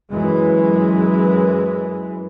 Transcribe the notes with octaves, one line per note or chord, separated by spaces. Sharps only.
F#2 E3 G#3